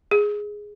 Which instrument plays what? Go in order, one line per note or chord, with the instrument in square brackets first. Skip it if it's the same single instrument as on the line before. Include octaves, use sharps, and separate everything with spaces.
[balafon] G#4